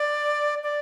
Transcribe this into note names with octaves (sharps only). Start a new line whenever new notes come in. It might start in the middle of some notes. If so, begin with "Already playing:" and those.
Already playing: D5
D5